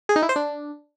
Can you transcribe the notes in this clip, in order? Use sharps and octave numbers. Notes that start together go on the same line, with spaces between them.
G#4
D#4
E4
C5
D4